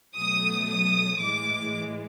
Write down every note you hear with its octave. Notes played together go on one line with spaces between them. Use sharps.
B2 F#3 A3 D#6
D#6
A2 E3 G#3 D6